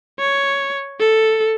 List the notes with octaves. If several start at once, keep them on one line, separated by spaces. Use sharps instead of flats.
C#5
A4